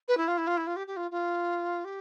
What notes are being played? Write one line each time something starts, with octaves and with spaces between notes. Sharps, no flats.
B4
E4
F4
E4
F4
E4
F4
G4
G4
F4
F4
G4